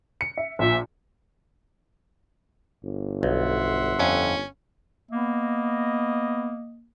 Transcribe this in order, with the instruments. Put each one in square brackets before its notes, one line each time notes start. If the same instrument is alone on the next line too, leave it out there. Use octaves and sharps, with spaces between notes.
[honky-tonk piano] C#7
E5
[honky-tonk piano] A#1 A#2 [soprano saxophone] E5
[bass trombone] G1
[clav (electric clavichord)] B1 [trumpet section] E5 F#5 C6
[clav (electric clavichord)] F2 [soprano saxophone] C#4
[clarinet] A#3 [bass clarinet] B3 [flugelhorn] D#5